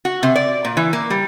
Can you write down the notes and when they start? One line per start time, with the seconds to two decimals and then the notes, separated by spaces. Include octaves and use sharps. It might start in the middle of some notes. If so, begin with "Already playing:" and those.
0.05 F#4
0.23 C3
0.36 D5
0.65 A#2
0.77 E3
0.93 A#3
1.10 G3